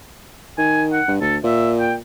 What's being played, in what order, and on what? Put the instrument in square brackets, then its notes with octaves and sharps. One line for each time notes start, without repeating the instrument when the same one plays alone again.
[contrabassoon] D#3 [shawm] G#5
[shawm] F#5
[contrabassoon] G2
[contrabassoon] D2 [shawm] A4
[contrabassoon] A#2 [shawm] E5
[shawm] G5